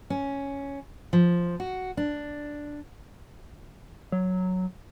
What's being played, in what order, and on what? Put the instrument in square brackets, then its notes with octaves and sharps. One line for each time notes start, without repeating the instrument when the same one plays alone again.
[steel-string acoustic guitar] C#4
F3
F#4
D4
[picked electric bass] F#3